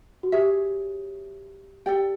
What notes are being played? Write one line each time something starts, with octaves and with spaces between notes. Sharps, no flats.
F#4
G4 G#4 C#5 E5
G4 A4 D5 G5